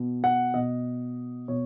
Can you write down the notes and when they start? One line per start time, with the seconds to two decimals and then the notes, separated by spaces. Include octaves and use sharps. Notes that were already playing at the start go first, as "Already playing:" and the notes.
Already playing: B2
0.24 F#5
0.54 B2 D#5
1.48 B2 C#5